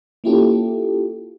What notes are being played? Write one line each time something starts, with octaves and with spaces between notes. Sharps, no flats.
A#3 C#4 E4 F4 G4 A4